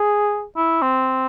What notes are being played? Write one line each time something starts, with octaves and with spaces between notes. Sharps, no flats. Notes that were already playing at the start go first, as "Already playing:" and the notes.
Already playing: G#4
E4
C4